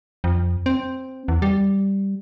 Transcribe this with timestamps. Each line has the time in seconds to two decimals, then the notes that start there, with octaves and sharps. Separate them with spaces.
0.24 F2
0.66 C4
1.28 E2
1.42 G3